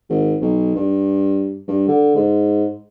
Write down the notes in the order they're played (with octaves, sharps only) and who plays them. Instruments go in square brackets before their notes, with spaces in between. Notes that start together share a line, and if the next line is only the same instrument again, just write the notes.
[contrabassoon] G#1
B1
G2
G2
D3
G#2